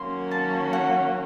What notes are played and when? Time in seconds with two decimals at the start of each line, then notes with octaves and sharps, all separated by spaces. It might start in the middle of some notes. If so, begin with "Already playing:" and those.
Already playing: D#3 F#3 A#3 C#4 F#4 C6
0.31 A5
0.73 F#5